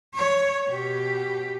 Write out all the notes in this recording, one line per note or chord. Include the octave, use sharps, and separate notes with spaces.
C#5
B2 G4